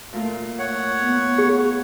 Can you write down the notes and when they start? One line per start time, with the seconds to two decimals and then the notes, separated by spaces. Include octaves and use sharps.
0.13 A#2 A3 F4
0.59 C#5 F#5
1.02 B3
1.38 G#4